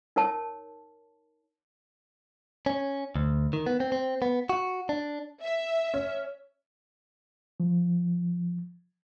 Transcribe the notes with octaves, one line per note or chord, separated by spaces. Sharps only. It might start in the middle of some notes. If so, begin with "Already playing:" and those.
D#4 A#4 C#5 A5
C#4
D2
D#3
B3
C4
C4
B3
F#4
D4
E5
C#4
F3